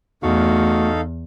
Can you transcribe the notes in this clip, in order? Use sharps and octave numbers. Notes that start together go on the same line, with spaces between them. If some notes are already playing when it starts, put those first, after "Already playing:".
E2 A3 D#4 F#4 A4 F5